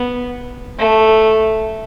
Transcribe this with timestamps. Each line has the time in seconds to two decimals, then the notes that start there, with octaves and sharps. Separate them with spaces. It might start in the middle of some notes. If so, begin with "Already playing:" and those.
Already playing: B3
0.79 A3